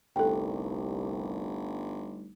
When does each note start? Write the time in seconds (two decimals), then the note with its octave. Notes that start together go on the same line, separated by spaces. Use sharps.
0.16 G1 C2 G3 A3 D#4 A4 G5